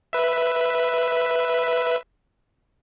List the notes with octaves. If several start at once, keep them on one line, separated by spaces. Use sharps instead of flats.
B4 E5